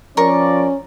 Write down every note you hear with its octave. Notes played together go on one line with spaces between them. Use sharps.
F3 C#4 A#4 D5 C#6